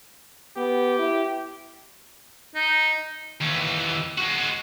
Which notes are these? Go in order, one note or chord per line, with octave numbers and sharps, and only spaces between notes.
B3 G4
E4
D#4
D#2 E3
G#3 F#4